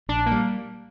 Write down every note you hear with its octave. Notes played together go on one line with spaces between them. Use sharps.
A#1 D4
A#3
G3